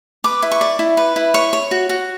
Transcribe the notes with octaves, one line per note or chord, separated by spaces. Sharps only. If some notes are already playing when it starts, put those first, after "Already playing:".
B4 D6
E4
C#6
D5
E4
B4
E4
C#5 C#6
C#5
F#4
F#4